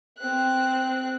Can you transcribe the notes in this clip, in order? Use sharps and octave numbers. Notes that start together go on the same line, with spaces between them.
C4 F#6